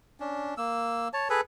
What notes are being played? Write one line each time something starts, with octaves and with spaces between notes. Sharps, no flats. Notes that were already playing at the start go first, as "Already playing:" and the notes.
C#4 D4
A#3 E6
C#5 A5
G#4 A4 B4